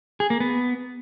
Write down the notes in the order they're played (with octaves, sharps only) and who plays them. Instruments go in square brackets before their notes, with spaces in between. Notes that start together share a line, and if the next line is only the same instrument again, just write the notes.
[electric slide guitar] G#4
A#3
B3